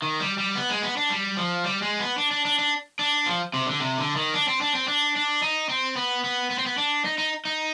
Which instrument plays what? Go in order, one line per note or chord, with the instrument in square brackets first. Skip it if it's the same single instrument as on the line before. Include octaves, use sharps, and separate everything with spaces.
[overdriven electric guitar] D#3
G3
G3
B3
G#3
B3
D4
G3
F3
G3
G#3
B3
D4
D4
D4
D4
D4
F3
C3
D3
C3
D3
D#3
D4
C4
D4
C4
D4
D4
D#4
C4
B3
B3
B3
C4
B3
D4
D#4
D#4
D#4